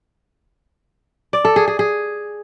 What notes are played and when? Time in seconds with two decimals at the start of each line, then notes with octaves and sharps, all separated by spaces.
1.33 D5
1.45 A4
1.56 G#4
1.68 G#4
1.79 G#4